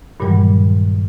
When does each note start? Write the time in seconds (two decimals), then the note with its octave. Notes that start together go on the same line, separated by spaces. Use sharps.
0.20 G2 A#2 D#3 E3 F#3 G3